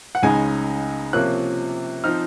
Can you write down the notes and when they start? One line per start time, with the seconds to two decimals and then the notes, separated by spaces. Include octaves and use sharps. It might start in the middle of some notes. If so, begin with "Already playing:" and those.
0.15 F#5
0.23 C#2 C#3 G#3 D#4 G#5
1.13 C3 F3 A#3 C#4 F#6
2.04 F3 C4 D#4 F6